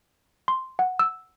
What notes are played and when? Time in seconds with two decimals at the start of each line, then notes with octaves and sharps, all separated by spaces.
0.48 C6
0.79 F#5
0.99 E6